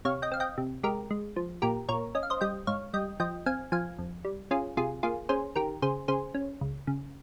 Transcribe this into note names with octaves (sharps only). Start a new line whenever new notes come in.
C3 C#5 F5
D#5 G5
C4 F5
D#5 G5
C3
G#3 G4 A#4
G#3
F3
A#2 G4 A#4
A#2 A#4 C#5
C#4 D#5
F5
C5 D#5
G3 D#5 G5
G#2 C#5 F5
G3 D#5 G5
F3 D#5 G5
C4 F5 G#5
F3 F5 G#5
F2
G3
C#4 F4 G#4
C3 F4 G#4
A#3 F4 G#4
C#4 G#4 C5
D#3 G4 A#4
C#3 G#4 C5
C#3 G#4 C5
C#4
C#2
C#3